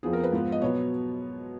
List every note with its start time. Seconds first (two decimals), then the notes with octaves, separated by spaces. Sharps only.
0.03 F2 F3 B3 G#4
0.13 A#4
0.24 B4
0.33 G#2 F3 B3
0.52 D#5
0.62 B2 F#3 B3 C#5